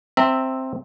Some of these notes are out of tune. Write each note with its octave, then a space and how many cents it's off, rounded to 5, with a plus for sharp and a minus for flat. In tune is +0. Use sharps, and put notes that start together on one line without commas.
C4 +0 E5 +0 A#5 -35